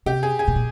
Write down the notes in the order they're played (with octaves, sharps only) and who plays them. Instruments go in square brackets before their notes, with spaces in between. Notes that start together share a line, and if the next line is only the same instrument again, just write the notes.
[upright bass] C3 [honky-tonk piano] G4
[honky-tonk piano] G#4
G#4
[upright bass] B2
A#2